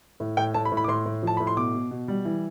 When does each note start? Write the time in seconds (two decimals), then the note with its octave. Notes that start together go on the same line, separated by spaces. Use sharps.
0.20 A2
0.37 A2 G5
0.54 A2 A5
0.65 B5
0.72 A2
0.77 B5
0.84 D6
0.88 A2 C6
1.06 A2
1.23 F3 A5
1.37 A2 B5
1.47 C6
1.57 B2 D6
1.74 B2
1.91 B2
2.08 G3
2.25 E3